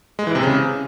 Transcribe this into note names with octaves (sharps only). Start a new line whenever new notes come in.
G#3
E3
C3
C#3